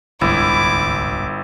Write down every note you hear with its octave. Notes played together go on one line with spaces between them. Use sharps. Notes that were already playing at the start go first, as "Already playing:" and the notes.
D1 G1 C2 G#2 E4 D6